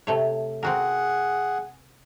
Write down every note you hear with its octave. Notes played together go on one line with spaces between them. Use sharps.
C3 A3 C#5
C4 F#4 G#4 A#4 F#5